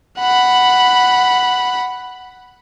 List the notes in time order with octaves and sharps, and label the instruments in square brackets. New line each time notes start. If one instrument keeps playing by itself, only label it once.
[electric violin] F#5 B5